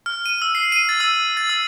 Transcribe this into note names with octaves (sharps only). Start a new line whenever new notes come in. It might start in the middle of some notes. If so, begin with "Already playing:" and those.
F6
D#7
E6
C7
D#7
A6
E6
A6
E6